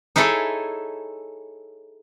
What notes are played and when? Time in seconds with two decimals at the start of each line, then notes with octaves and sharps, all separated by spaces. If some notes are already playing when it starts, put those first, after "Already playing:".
0.16 D#4 E4 G#4 A4 C#5